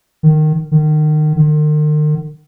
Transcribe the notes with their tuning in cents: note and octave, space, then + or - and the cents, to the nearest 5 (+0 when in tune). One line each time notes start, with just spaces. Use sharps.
D#3 -15
D#3 -30
D#3 -45